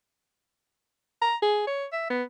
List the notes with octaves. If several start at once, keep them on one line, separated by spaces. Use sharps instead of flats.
A#5
G#4
C#5
E5
B3